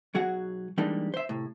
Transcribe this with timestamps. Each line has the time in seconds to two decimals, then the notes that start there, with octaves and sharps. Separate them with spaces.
0.14 B1 F#3 F#4 G#4 F#5
0.78 E3 G3 G#3 A#3 D4 D#4
1.14 C5 E5
1.29 A2 C3